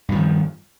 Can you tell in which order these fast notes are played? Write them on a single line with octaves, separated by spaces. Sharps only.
G2 F3 D#3